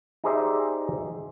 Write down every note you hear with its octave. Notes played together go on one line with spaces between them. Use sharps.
D#4 G4 G#4 C5 D5 E5